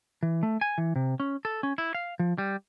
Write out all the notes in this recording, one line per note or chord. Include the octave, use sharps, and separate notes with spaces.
E3
A3
G#5
E3
C3
C#4
A4
C#4
E4
F5
F3
G3